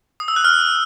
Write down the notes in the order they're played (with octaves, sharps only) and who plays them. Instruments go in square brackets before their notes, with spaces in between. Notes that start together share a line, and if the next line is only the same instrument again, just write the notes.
[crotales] D#6
E6
F#6
F6